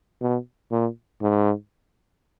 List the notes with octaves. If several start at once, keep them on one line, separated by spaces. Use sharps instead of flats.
B2
A#2
G#2